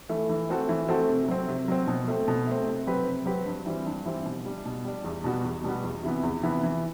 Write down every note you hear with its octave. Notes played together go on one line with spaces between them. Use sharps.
E3 A3
E3
A3 C4 F#4 A4
E3
A3 C4 F#4 A4
C3
F#3 C4
C3
F#3 C4
B2
A3 C4
B2
A3 C4
C3
F#3 C4 G4 B4
C3
F#3 C4 G4 B4
G2
E3 G3 C4
G2
E3 G3 C4
B2
G3 D4
B2
G3 D4
E2
B2 G3 B3 F#4
E2
B2 G3 B3 F#4
E2
C3 E3 B3
E2
C3 E3 B3
E3